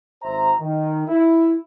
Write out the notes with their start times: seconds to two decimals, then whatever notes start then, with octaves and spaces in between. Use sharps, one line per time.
0.23 G#1 C5 E5 A#5
0.60 D#3
1.08 E4 E5